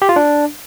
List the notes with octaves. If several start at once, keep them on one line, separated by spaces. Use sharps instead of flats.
G4
F4
D4